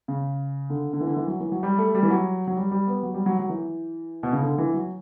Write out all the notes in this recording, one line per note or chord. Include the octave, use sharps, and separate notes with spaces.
C#3
D3
D3
E3
D3
E3
F#3
E3
F#3
G3
A3
G3
E3
F#3
F#3
G3
G3
B3
F#3
G3
F#3
F#3
E3
B2
C#3
D3
E3
F#3